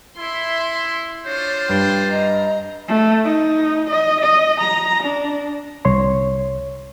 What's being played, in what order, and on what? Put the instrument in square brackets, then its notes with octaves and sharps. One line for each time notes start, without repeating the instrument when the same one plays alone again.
[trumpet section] E4 [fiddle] E5 C6
[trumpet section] D4 F4 C5 [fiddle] C#5
[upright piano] G2 [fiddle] G5
[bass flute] D#5 [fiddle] A#5
[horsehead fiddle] A3
D#4
D#5
D#5
A#5
D4
[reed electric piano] C2 C#5 C6